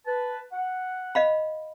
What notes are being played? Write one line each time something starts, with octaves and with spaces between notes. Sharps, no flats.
B4 A5
F#5
D#5 F5 B5